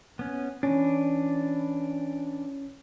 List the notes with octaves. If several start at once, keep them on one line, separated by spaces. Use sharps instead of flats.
B3 C#4
E3 C#4 D4